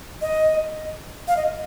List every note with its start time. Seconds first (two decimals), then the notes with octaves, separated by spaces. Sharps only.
0.22 D#5
1.28 F5
1.37 D#5